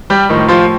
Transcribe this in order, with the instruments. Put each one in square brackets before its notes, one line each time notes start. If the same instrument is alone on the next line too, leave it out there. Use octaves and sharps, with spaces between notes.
[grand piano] G3 G4
A2 D#3 F3 D#4
F3 F4